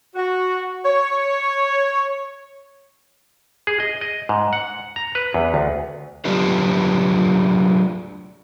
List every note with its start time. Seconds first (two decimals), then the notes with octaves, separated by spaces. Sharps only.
0.15 F#4
0.85 C#5
3.67 G#4
3.80 D#5
4.01 D#5
4.29 G#2
4.53 F#5
4.96 A#5
5.15 B4
5.34 E2
5.54 D2
6.25 F#3 D4 F4 G4 B4